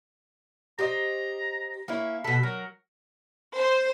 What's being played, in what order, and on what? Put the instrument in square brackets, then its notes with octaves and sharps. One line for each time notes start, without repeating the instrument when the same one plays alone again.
[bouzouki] G4 C5 D#5 [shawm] A#5
[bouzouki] A#3 C#4 E4
[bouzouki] B2 A4 [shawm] B5
[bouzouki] F#3 [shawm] A#4
[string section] C5